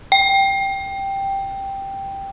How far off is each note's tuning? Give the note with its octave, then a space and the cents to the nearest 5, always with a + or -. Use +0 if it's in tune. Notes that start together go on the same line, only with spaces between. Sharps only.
G5 +0